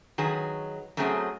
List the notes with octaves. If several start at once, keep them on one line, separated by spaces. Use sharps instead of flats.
D#3 F#3 G#4 B4
F#2 F#3 A3 C4 G#4